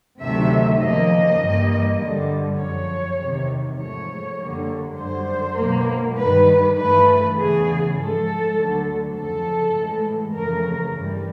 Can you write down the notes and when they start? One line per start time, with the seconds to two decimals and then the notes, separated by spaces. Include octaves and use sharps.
0.21 D2 C3 D#3 F#3 A3 E5
0.80 D#2 C#3 F3 A#3 D#5
1.40 G2 E3 G3 A#3
1.99 G2 D3 G3
2.59 F#2 C#3 F3 C#5
3.19 E2 C3 D#3
3.78 G#2 F3 A3 C#5
4.38 F#2 D3 G3 A#3
4.97 F#2 D3 G3 C5
5.57 B2 F#3 A#3
6.17 G2 D#3 G3 B4
6.76 G2 E3 A3 B4
7.36 E2 C#3 E3 G#4
7.95 G#2 F3 G#3 A4
8.55 D2 D3 F#3
9.15 F2 C#3 F3 A4
9.75 A2 E3 G#3
10.34 F2 C#3 E3 A3 A#4
10.94 G2 E3 G3